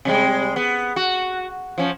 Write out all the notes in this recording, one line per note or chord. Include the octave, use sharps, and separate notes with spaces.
C3 G3 G#3
B3
F#4
F3 C#4